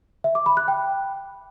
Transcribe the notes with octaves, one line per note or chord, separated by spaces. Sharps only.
E5
D6
B5
F#6
G5